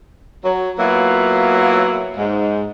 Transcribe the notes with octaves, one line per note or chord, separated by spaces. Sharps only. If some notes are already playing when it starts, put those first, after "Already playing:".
F#3
F#3 A#3 B3 E4 F4
G#2